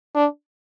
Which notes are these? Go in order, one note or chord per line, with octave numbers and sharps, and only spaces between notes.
D4